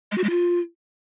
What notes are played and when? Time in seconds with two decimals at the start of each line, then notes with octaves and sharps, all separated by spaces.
0.12 G#3
0.18 F#4
0.24 G#3
0.30 F4